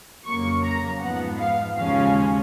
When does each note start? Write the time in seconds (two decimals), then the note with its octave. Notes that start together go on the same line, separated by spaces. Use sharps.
0.25 F2 C#3 F#3 A#3 C#6
0.63 A#5
1.01 G#2 F3 B3 F#5
1.38 F5
1.76 D#2 C#3 F3 G#3 C#4 F5